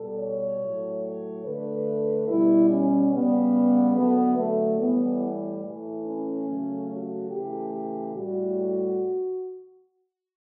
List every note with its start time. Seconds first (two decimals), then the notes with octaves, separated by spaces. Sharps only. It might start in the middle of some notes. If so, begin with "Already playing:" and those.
Already playing: B2 G3 A4
0.19 C#5
0.61 A2 F#3 A3
1.02 C#5
1.44 D3 A3 B4
2.28 B2 G3 E4
2.70 C#4
3.12 C#3 G3 B3
3.95 D3 F#3 A3 B3
4.37 A3
4.79 A2 E3 G3 B3
5.63 A2 E3 A3
6.05 C#4
6.47 C#3 F#3 A3
6.89 F#4
7.30 C#3 E3 A3 G4
8.14 A2 G3 F#4